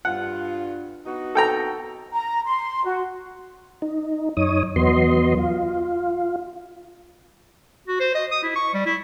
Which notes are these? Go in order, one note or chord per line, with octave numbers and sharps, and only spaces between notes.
G2 F4 F#5
B3 D#4 F#4
A4 G5 A#5
A#5
C6
F#4
D#4
F#2 D#4 C#5 D#6
E2 F#3 B3 D#5 C6
F4
F#4
C5
D#5
D#6
E4
C#6
G3
E4